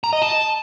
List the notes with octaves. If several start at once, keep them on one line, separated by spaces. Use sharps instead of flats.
A#5
D#5
A5